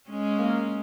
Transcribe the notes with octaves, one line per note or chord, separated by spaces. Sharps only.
G#3 C#4
A#3